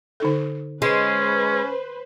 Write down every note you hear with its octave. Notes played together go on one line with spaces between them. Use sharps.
D3 D#4 A4
G#3 C#4 B4 C5